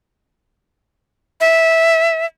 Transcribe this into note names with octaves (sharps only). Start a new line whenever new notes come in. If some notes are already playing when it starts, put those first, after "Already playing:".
E5